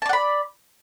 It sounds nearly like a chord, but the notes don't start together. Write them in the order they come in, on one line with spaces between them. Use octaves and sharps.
A5 D5 F#5 B5